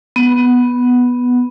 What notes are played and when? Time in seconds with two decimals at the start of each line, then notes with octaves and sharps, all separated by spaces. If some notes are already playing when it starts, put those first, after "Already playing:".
0.16 B3